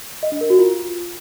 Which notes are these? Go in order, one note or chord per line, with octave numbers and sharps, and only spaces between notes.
D#5
D4
A#4
F#4
F4